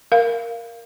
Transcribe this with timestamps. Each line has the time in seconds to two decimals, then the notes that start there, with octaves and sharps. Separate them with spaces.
0.12 A#4 F5